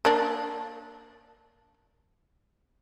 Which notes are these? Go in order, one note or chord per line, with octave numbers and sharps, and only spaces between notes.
A#3 D4